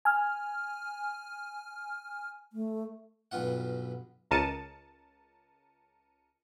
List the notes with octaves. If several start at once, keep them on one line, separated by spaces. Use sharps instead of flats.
G#5 F6
A3
B1 G2 B3 F4 F#5
C#2 A#4 A5 C#7 D#7